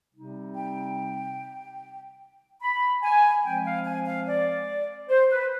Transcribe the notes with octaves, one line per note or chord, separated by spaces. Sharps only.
C3 G3 C4 D#4
G5
B5
G#5
F3 G#3 C4 G5
F5
G#5
F5
D5
C5
B4